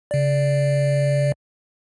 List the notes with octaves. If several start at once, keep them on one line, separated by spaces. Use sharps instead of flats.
C#3 D5